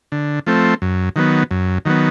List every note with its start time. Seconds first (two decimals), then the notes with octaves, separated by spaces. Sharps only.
0.12 D3
0.47 F3 A3 C4
0.82 F#2
1.16 D#3 F#3 B3
1.51 F#2
1.85 D#3 F#3 B3